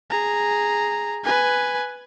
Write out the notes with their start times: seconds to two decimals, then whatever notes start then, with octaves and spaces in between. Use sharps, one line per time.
0.10 G#4 A#5
1.24 B4 G#5